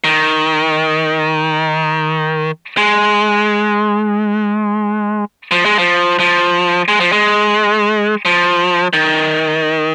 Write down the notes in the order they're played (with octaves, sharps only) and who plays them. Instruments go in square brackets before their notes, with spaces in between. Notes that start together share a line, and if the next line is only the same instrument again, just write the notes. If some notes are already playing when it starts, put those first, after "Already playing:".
[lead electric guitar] D#3
G#3
F3
G#3
F3
F3
G#3
F3
G#3
F3
D#3